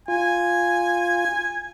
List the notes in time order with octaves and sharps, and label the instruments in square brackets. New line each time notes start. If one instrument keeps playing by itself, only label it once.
[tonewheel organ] F4 [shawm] G#5